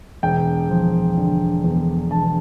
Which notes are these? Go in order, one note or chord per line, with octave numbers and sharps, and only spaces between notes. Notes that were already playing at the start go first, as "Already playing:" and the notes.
E1 G5
F3
D3
E2
E1 A5